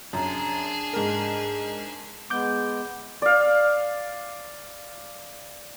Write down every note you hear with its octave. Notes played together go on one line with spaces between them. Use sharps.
F#2 D4 G#4
G#2 A#4
G#3 B3 D6 G6
D5 F5